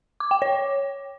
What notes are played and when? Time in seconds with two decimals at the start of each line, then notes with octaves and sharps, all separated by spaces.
0.20 D6
0.31 G5
0.42 C#5